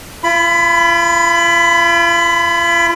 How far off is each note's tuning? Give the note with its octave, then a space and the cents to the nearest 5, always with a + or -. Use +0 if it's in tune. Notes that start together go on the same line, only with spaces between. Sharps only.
F4 -40 B5 +15